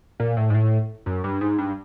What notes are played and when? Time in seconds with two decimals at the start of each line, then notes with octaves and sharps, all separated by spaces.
0.20 A#2
0.37 A2
0.50 G#2
0.54 A2
1.06 F#2
1.24 G2
1.41 G#2
1.58 G2